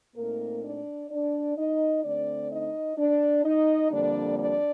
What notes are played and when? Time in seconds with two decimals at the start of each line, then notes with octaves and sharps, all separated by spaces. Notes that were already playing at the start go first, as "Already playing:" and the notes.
0.16 A#2 A3 A#3 C4 D#4 A#4
0.64 D4 D5
1.10 D4 D5
1.57 D#4 D#5
2.03 D3 A3 C4 D4 D5
2.51 D#4 D#5
2.97 D4 D5
3.44 D#4 D#5
3.91 F2 D3 G3 A#3 D4 D5
4.39 D4 D5